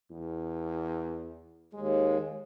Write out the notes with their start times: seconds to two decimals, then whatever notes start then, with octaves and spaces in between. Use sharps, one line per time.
0.11 E2
1.73 D#2 G#3